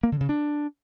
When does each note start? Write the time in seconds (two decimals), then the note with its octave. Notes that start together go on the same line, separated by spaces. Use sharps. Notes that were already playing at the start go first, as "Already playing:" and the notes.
0.03 A#3
0.12 D3
0.21 C#3
0.29 D4